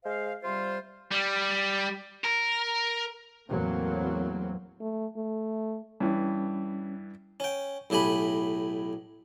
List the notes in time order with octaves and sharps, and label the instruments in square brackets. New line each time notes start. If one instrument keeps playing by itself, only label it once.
[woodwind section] G#3 C5 F5
C3 G3 F4 C5
[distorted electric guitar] G3
A#4
[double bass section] E2 A2 F#3 A#3 C4
[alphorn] A3
A3
[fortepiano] G2 E3 [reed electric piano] G3 C#4
[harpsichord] C#4 G5
B1 A2 G4 G#5 B5